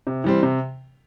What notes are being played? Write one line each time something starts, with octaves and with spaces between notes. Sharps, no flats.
C3
E3 G3 C4
C3